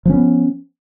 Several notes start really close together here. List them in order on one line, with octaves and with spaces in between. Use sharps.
F3 C#4 B3